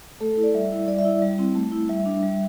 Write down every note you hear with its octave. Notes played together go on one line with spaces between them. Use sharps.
A3 A4
A4
E4
D5
G3 E5
E4
G3 D5
E5
E4
G3
C4 E4
A3
E4
G3 E5
D4
G3